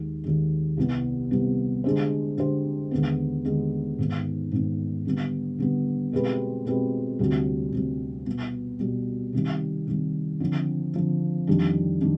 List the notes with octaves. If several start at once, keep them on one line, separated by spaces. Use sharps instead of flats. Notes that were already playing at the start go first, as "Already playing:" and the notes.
Already playing: D#2 D#3 G#3
D#2 D#3 G#3
C2 C3 G3 B3
C2 C3 G3 B3
D3 G#3 D4 G4 C5
D3 G#3 D4 G4 C5
D#2 D3 G#3 B3
D#2 D3 G#3 B3
G#2 D#3 B3
G#2 D#3 B3
D3 G3 B3
D3 G3 B3
B2 G#3 C4 G4 B4
B2 G#3 C4 G4 B4
D2 C3 G3
D2 C3 G3
B2 G3 B3
B2 G3 B3
C3 D#3 G3
C3 D#3 G3
D3 F3 C4
D3 F3 C4
F2 D#3 G3 D4
D#3 G3 D4